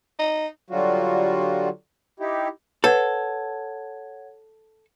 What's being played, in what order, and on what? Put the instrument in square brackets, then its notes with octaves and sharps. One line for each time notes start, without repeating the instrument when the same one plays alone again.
[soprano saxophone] D#4
[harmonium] D3 F#3 G3 F4 F#4
D#4 E4 G4
[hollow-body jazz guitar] A4 [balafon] B4 [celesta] C#5 F#5 G#6